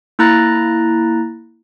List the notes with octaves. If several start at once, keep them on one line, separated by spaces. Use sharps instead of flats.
A#3 E4 A#5 F#6 A6 A#6